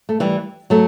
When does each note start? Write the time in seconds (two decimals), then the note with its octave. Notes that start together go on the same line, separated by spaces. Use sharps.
0.09 A3
0.20 E3 G3
0.70 F#3 A3